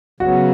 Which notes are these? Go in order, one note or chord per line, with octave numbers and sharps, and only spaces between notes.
C#3 F#3 B3 F#4